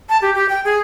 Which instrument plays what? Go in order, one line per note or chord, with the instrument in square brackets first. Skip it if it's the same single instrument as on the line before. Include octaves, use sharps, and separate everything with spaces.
[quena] A5
G4
G4
G5
G#4